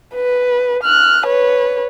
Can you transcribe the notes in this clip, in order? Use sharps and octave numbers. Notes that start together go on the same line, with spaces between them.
B4
F6 F#6
B4 C#5